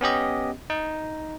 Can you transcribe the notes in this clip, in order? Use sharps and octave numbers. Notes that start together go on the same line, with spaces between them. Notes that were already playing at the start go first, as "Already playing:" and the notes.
B3 C#4 G4 D#5
D#4